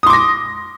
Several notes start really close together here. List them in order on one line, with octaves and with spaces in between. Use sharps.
D#6 C6 D6 A#6